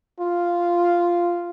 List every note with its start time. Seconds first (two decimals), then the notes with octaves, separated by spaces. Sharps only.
0.20 F4